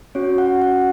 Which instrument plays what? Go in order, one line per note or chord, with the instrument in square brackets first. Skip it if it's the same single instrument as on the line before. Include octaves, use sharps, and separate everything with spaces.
[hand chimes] C#4 F#4 C#5
F#5
F#5